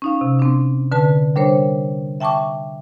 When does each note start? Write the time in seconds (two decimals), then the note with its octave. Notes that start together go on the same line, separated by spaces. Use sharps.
0.02 C#4 D#4 F5
0.21 C3
0.39 C4 D4
0.92 D3 B4 A5
1.36 G3 D4 A#4 C5 C#5
2.20 E5 G5 A5 C#6 D6